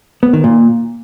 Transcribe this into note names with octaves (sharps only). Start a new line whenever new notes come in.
B3
D#3
A#2